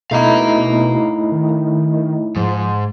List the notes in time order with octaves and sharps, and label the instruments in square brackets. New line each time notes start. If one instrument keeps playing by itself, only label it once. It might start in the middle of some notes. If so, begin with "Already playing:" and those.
[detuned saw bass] B2 [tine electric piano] A3 D#4 E4 [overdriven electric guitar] F5 A#5
[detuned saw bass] D#3
[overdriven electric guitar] G#2 [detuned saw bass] F3